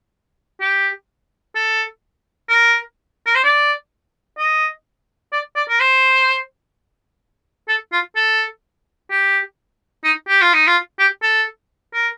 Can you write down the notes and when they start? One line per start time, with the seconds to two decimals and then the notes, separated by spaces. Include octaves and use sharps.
0.61 G4
1.55 A4
2.49 A#4
3.26 A#4
3.35 C5
3.44 D5
4.38 D#5
5.33 D5
5.56 D5
5.69 A#4
5.80 C5
7.68 A4
7.92 F4
8.16 A4
9.11 G4
10.04 D#4
10.29 G4
10.42 F4
10.54 D#4
10.67 F4
11.00 G4
11.23 A4
11.94 A#4